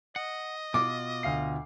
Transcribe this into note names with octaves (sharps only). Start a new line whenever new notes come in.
D#5 F#5
B2 F4 D6
D2 F5 C7